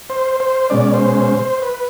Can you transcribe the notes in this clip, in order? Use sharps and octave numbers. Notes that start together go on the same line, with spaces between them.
C5
C5
B2 G#3 C#4 D5
C5
C5
C5
B4